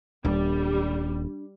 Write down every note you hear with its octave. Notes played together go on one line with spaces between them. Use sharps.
D#1 G3 D4